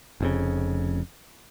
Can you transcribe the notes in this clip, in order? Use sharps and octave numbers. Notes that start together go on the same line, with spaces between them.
F1 F2 C#3